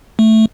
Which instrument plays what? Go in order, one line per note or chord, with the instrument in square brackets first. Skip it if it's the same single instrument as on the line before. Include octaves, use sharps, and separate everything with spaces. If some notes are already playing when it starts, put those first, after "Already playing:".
[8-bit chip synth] A3